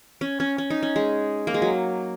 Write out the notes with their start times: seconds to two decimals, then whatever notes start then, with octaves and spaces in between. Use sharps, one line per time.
0.21 C#4
0.40 C#4
0.58 C#4
0.70 D#4
0.83 C#4
0.96 G#3
1.47 A#3
1.54 G#3
1.62 F#3